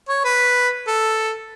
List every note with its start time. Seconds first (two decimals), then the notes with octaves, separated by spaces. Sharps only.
0.09 C#5
0.24 B4
0.87 A4